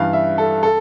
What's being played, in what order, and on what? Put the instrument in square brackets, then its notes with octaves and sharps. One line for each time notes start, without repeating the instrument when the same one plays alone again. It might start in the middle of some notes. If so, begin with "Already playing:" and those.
Already playing: [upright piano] G2 E3 G3 F5
E5
A4
A4